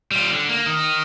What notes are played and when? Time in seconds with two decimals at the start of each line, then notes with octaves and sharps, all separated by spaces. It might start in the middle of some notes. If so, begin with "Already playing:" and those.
0.11 G3 F4
0.30 D3
0.49 A#3
0.66 D#3